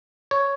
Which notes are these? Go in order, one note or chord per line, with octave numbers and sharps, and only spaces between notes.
C#5